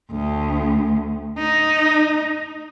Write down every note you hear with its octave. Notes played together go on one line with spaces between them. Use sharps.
D2
D#4